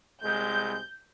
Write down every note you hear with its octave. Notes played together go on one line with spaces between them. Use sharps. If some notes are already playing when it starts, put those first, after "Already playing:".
C2 G#3 G6